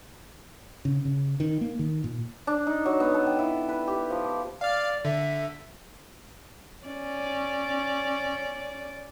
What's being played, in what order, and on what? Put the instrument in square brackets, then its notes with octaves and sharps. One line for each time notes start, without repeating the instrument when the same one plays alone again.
[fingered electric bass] C#3
C#3
D#3
A#3
D#3
A#2
[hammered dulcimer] D4
D#4
F#3
B3
A4
G5
E4
B4
G4
F3
D6
[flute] D5 [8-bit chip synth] F5 F6
[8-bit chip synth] D3 [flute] E5
[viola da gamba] C#4 D5